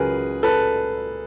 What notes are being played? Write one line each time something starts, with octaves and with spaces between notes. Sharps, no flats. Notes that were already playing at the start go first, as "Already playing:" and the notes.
Already playing: C#2 C#3 F#3 G#4 A#4 B4
A4 B4